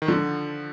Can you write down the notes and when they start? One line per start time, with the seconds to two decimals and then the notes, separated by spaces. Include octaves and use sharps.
0.02 D#3
0.08 D3 F3